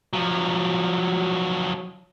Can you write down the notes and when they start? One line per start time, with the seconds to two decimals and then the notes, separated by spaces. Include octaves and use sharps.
0.13 F3 F#3